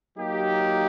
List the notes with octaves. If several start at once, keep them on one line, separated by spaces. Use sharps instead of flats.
F#3 A#3 D#4 G4